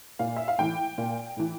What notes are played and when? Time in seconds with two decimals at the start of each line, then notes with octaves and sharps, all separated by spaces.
0.19 A#2 F5
0.36 E5
0.48 F5
0.58 A2 E3 G5
0.98 A#2
1.37 A2 E3